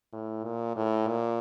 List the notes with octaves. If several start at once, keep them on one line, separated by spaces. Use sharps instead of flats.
A2
A#2
A2
A#2